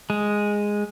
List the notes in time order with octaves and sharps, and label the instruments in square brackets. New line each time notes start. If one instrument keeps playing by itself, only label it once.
[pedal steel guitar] G#3